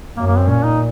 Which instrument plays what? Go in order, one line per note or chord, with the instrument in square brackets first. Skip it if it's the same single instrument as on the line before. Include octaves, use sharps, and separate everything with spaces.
[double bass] F#2 [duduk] A#3
[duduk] A#3
C4
[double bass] A#2 [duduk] C#4
[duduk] D#4